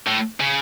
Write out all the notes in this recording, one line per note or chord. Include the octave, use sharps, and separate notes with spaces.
A2
C#3